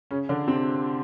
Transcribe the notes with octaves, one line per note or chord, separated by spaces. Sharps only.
C#3 C#4
D3 D4
C3 C4